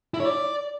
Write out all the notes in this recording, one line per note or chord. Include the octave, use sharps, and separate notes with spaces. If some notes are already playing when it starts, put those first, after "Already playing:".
E4
C#5
D5